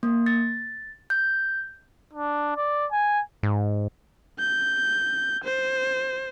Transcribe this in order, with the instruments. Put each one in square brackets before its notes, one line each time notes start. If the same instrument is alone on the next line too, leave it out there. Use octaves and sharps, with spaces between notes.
[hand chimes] A#3
A6
G6
[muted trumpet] D4
D5
G#5
[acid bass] G#2
[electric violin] G6
C5